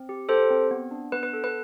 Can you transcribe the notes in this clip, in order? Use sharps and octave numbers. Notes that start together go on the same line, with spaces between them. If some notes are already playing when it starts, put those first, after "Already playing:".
Already playing: C4
G4
G4 A4 C5
C4
B3
D4
B3 B4
B4
A4
B4